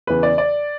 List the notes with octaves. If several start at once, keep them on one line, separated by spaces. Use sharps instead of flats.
E2 C#3 E3 B4
D5
D5